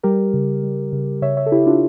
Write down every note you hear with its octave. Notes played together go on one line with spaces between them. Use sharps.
G3 G4 A#4
C#3
G3
C#3
C#3 C#5 E5
C#5 E5
A4
C#3 E4 G4
D4 F4